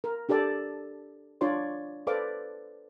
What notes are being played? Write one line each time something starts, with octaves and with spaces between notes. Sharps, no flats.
A#4
D4 G4 A4 D5 A5
D4 F4 C#5 D5 C6
A4 B4 C5 D5 F5 D6